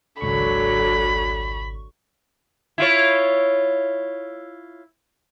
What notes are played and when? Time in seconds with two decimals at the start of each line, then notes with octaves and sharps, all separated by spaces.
0.21 G#1 C#2 D3 F#3 B5 C#6
2.78 E4 F4 C#5